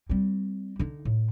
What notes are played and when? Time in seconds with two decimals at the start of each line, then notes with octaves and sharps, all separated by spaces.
0.09 G3 C4
0.79 D3 D#4
1.05 A2